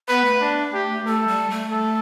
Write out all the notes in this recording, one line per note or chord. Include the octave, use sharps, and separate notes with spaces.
B3 B4
A3
D4
G4
A3 A4
G3
A3
A4